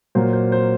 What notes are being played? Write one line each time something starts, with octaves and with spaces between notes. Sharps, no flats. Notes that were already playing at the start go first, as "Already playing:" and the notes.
A#2 F#3 A#3 C5
C5
C5